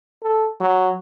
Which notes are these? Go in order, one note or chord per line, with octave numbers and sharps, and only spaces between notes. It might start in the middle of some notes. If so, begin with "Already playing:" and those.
A4
F#3